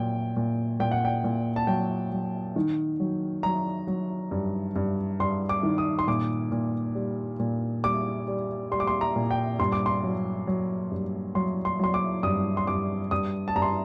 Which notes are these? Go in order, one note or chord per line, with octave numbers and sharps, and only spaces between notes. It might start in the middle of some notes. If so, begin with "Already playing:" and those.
Already playing: A#2 F#3 G5
A#2
A#2 G5
F#5
G5
A#2
A5
F#3 G5
F#3
D#3
F#3
F#3 A#5
F#3
G2
G2
G2 C6
D6
D#3
D#6
C6
A#2 D6
A#2
G3
A#2
G3 D6
G3
G3 C6
D6
C6
A#5
A#2
G5
G2 C6
D6
C6
F#3
F#3
G2
F#3 C6
C6
F#3 C6
D6
G2 D#6
C6
G2 D6
G2 D#6
A5
G2 A#5
C6